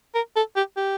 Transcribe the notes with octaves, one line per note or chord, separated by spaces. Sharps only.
A#4
A4
G4
G4